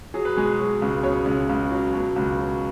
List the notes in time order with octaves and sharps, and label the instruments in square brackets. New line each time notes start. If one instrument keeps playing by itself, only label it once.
[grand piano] F#3 G#4
B4
B2 G#3 G#4
F#3
C#2
B2 C#4 C#5
C#2
C#2
F#3
B2
C#2
F#3